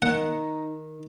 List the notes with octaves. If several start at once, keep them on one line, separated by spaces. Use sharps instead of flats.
D#3 D#4 F#5